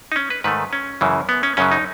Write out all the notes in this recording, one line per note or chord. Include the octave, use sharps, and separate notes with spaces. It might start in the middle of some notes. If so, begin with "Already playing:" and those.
D#4
C#4
B4
G#2 D#3 A3 B4
C#4
F#2 C#3 E3
B3
C#4
F#2 C#3 F#3 C#4
D#4